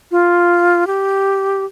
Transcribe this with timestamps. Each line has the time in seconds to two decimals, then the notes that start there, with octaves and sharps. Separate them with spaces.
0.11 F4
0.87 G4